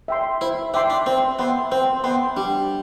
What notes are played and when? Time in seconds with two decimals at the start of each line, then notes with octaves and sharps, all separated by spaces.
0.08 E5 G5 C6
0.41 E4 C5
0.74 D4 E5 G5 C6
0.90 D4
1.06 C4 C5
1.39 B3 E5 G5 C6
1.72 C4 C5
2.04 B3 E5 G5 C6
2.36 G3 D4